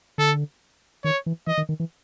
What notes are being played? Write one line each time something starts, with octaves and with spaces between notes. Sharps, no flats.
D3 A4
D#3 C#5
E3
E3 D#5
D#3
D#3
E3